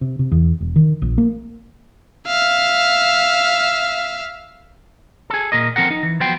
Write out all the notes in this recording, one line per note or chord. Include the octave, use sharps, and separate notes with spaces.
C3
C3
E2
E1
D#3
A#1
A#3
E5 F5
G#4 A4
A#2 A#4 D#5
F3 C4 A4 A#4 F#5
D#4
E3
F3 F#3 B3 C5 G5